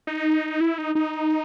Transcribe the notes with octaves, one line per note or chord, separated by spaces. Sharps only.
D#4
E4
D#4
D#4